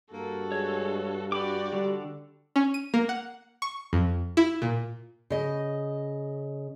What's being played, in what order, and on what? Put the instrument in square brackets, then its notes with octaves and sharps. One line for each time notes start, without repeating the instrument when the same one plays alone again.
[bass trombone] G2 [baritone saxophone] A#3 [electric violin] F#4 A4
[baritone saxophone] G#3 [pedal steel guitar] C#5
[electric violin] F#4 D5 [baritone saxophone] G4 [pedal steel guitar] B5 D6
[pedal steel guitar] D3 [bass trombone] G3
[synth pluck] C#4
D#7
A#3
F#5
C#6
F2
E4
A#2
[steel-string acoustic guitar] C#3 D#5